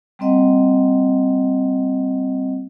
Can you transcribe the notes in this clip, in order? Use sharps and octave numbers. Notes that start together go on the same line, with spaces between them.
G3 A#3 C4 D#5 F#5